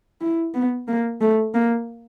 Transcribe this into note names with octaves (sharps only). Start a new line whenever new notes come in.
E4
B3
A#3
A3
A#3